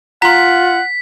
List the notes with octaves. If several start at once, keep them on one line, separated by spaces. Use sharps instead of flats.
F4 F#5 A#5 C6 B6